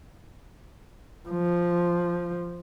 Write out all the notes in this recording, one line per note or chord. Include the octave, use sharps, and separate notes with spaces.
F3